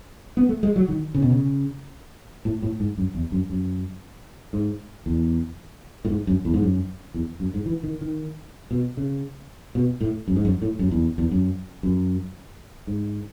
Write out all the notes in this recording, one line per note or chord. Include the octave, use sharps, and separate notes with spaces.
B3
A3
G#3
F#3
D#3
C#3
B2
C#3
A2
A2
G#2
F#2
E2
F#2
F#2
G#2
E2
A2
G#2
F#2
E2
G#2
F#2
E2
F#2
G#2
E3
D#3
D#3
B2
C#3
B2
A2
F#2
G#2
F#2
A2
F#2
E2
E2
F#2
F#2
G#2